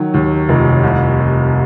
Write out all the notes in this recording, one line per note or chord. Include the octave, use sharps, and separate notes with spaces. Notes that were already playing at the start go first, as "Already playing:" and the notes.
Already playing: D#3 F#3
D#2
F1
C2